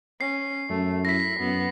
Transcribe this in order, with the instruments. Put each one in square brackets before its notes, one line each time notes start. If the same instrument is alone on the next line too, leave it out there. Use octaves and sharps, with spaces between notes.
[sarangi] C#4 [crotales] C7
[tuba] F#2 [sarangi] A3
[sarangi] E4 [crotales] A#6 B6
[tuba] F#2 [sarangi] B3